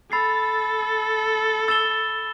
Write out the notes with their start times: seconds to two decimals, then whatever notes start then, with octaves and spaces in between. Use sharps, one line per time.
0.12 A4 B5 E6 A6 C7
1.68 E6 A6 E7 G7